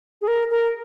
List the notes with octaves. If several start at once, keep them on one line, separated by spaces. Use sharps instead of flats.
G#4
A#4
A#4